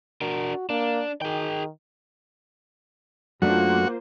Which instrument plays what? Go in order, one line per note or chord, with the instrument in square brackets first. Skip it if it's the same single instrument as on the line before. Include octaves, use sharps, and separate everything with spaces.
[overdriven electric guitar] D4 A#4 [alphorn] F#4
[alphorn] A#3 [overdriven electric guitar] D4
[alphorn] D#3 [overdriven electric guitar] G#4 G5
[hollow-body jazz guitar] F#2 A3 D4 [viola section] A#3 F4 C5 [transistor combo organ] F#4